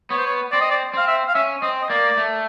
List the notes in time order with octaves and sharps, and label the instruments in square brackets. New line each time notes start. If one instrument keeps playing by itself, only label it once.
[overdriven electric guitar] B3 [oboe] C#5
[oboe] C5
C#5
[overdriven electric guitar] C4 [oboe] D5
[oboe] D#5
D5
[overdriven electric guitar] C4 [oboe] F5
[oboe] E5
F5
[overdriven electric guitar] C#4 [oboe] E5
[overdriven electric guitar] C4 [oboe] D#5
[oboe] D#5
[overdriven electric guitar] A#3 [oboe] D5
[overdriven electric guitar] A3